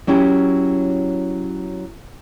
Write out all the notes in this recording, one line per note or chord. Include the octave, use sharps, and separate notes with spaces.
F#3 C#4 E4 G4